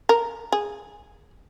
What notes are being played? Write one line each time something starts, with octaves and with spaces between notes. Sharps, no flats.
A#4
G#4